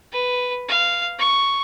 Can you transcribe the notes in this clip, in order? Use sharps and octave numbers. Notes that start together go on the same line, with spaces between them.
B4
F5
C#6